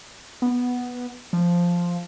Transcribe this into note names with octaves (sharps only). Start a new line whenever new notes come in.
B3
F3